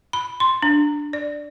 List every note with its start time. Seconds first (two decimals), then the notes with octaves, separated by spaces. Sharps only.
0.13 B5
0.40 C6
0.62 D4
1.13 D5